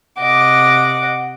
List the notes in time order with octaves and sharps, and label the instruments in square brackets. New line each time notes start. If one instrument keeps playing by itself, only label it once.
[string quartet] C3 D#5 D6 [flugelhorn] F#5